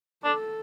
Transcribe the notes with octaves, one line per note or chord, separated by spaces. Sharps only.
D4 A4